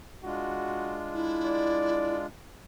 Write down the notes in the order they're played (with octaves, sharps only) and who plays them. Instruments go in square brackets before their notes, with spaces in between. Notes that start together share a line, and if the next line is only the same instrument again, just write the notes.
[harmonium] G#3 D4 F4 [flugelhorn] F#4
[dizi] E4
[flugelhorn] D5